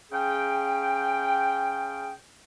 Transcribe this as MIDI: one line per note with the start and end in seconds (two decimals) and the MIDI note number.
0.12 2.13 49
0.12 2.13 61
0.12 2.13 68
0.12 2.13 79